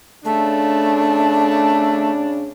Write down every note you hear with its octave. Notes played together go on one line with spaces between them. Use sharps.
C#3 A3 D4